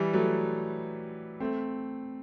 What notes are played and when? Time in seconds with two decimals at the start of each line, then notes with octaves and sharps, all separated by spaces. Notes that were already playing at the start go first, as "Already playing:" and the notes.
Already playing: E3 G3
0.13 F#3 A3
1.40 A3 C4